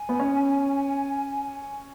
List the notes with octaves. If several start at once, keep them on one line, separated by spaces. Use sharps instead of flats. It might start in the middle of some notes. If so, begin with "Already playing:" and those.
Already playing: G#5
B3
C#4